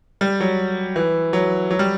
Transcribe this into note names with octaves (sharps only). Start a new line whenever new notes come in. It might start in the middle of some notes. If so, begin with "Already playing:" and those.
G3
F#3
E3
F#3
F#3
G3